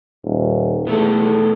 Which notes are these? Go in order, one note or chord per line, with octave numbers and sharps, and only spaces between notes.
D#1
E2 B2 A3 A4